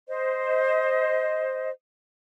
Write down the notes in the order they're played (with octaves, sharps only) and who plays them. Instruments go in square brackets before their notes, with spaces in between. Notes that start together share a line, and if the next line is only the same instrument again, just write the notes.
[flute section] C5 D#5